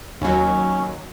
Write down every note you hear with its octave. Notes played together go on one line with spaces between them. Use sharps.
D#2 F#3 C#4